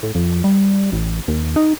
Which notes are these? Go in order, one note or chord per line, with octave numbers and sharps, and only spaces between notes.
A2
F2
G3
A1
D#2
D#4